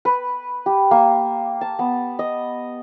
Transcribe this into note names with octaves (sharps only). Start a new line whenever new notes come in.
B4
G4
A#3
A5
B3
D#5